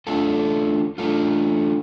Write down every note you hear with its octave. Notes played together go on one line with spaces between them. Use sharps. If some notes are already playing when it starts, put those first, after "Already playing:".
A3 D4 F4 A4
A3 D4 F4 A4